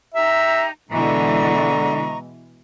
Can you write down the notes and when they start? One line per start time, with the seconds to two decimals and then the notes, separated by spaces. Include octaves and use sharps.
0.14 D#4 G4 E5 A#5
0.91 B2 D3 E3 G#3 D#5 A#5 C#6